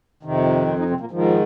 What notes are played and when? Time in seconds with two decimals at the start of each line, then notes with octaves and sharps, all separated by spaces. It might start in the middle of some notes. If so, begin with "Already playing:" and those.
0.23 F2 C3 D#3
0.67 C3 C4
0.79 D#3 D#4
0.90 C3 C4
1.00 A#2 A#3
1.11 G#2 D#3 F3